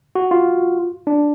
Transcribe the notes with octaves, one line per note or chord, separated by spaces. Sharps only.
F#4
F4
D4